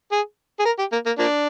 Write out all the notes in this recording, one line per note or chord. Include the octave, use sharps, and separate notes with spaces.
G#4
G#4
A#4
G4
A#3
A#3
F3 A#3 D4